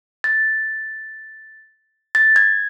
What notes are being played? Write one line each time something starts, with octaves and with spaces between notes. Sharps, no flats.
A6
A6
G#6